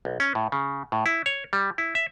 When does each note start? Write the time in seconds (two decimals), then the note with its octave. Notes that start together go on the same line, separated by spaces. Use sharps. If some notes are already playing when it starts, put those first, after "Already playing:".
0.05 B1
0.20 C#4
0.35 A2
0.52 C#3
0.92 A2
1.06 E4
1.26 C#5
1.53 G3
1.78 E4
1.95 E5